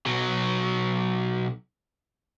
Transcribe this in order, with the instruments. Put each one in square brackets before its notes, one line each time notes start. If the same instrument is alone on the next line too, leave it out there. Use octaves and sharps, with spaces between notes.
[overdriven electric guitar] B1 F#3